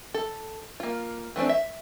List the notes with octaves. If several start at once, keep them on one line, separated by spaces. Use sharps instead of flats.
A4
A#3 F4
E3 A3 C4 D4
E5